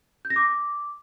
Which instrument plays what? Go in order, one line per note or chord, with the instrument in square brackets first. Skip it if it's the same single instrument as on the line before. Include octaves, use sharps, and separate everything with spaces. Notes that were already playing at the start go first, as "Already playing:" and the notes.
[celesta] G6
A#6
D6